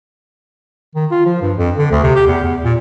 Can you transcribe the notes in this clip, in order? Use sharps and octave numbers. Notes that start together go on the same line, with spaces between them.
D#3
F4
F3
G2
F2
D3
D2
C3
G4
E2
E2
A#2